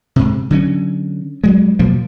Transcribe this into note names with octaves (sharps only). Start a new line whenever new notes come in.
G#2 C3
D3 F#3 C#4
G2 F#3 G#3
B2 F3 F#3 A#3